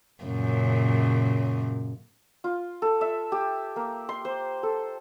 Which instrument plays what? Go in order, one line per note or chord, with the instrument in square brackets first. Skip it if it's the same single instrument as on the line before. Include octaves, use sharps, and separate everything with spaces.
[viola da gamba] F#2 A#2 C#3
[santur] F4
A4
E5
G4
A#3
C6
C5
A4